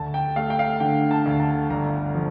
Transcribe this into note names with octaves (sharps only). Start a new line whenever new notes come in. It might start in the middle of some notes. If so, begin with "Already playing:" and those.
Already playing: D2 A5
G5
A3 F5
G5
F5
D3 G5
A5
D2
A5
G1 A#5
F3